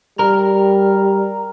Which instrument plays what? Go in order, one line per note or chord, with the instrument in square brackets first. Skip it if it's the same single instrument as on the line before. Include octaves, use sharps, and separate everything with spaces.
[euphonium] G3 [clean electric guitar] A#4